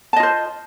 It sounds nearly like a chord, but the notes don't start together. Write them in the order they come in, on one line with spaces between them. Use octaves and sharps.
A5 D#5 F4 C5